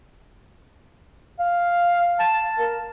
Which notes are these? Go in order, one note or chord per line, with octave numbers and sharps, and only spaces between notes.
F5
A5
A#4